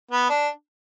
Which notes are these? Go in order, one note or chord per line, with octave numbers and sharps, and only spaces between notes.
B3
D4